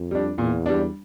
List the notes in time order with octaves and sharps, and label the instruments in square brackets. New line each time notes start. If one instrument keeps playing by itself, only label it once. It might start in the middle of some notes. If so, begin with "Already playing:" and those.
Already playing: [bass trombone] F2
[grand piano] G3 D4
[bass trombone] E2 [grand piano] A#2
[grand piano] G3 D4